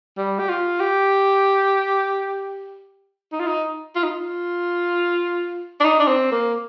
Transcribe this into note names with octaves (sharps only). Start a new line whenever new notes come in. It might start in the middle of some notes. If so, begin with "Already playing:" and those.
G3
G4
F4
G4
D#4
F4
D#4
F4
D#4
F4
D4
D#4
D4
C4
A#3